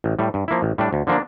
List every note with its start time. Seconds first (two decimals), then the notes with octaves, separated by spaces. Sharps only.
0.04 A1
0.19 A2 G3
0.34 G2
0.48 F3 A#3 E4
0.62 A1
0.78 A2 G3 D4
0.93 D2
1.07 D3 F3 A#3 D4